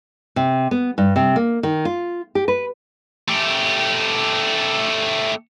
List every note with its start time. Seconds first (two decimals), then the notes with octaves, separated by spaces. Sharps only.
0.36 C3
0.71 B3
0.98 G2
1.16 C3
1.36 A#3
1.63 D#3
1.85 F4
2.35 G4
2.48 B4
3.28 A3 G4